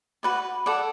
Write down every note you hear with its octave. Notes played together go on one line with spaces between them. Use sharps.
F#4 B4 D5
A4 D5 F#5